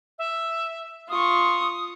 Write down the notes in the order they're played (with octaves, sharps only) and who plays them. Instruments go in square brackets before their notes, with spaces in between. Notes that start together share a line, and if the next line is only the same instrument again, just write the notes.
[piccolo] E5
[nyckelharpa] F4 C#6 [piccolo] D#6